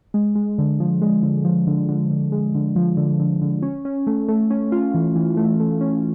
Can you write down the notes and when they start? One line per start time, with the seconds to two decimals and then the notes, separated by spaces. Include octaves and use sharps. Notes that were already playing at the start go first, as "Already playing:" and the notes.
0.14 G#3
0.35 G#3
0.58 D3
0.80 F3
1.02 G#3
1.23 D3
1.45 F3
1.67 D3
1.89 D3
2.10 D3
2.32 G#3
2.55 D3
2.76 F3
2.97 D3
3.19 D3
3.42 D3
3.62 C#4
3.85 C#4
4.07 A3
4.28 A3
4.50 C#4
4.72 F4
4.94 E3
5.15 E3
5.37 A3
5.60 A3
5.81 C#4